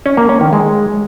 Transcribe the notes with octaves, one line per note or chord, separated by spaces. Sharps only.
C#4
A#3
C#4
D#3
G#3